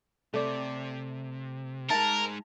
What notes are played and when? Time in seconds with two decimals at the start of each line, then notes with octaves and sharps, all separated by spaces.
0.34 C3 A3 D5
1.90 G#3 D#4 A#4 A5